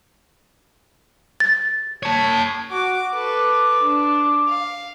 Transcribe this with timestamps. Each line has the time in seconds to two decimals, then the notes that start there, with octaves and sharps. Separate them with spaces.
1.40 A6
2.03 C#5 A5
2.71 F#4 D6
3.13 A4 B4 D6
3.82 D4
4.48 F5